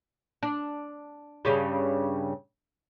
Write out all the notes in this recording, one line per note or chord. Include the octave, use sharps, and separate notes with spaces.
D4
G2 C#3 G3